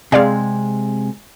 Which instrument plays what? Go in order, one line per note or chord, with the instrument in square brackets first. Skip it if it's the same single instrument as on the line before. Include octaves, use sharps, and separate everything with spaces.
[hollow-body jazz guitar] C3 G#3 [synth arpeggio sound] G#4 D5 F5